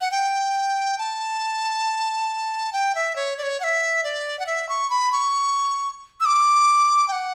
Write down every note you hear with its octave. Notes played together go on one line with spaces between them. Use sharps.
F#5
G5
A5
G5
E5
C#5
D5
C#5
F#5
E5
D5
F#5
E5
C#6
B5
C#6
E6
D6
G5
F#5